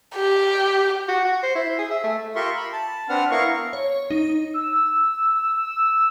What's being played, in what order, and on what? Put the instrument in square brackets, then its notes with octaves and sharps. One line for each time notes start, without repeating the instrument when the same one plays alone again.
[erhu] G4
[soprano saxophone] F#4
F#4
C5
E4
G#4
E5
A3
[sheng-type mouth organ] F4 G4 A#4 E5 C6 C#6
B5
A5
C4 D4 B4 F#5 F6
B3 E4 A#4 F5 C#6
[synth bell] C#5
D#4
[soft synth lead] E6
E6